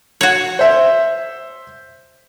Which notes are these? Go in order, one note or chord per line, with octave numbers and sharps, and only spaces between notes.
F#4 C#5
C5 E5